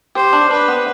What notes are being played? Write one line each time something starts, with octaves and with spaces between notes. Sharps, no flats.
G4 C5
D4
D4 B4
B3